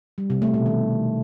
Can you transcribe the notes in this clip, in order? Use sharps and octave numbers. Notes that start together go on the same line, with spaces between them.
G3
C3
A3
B2
D#3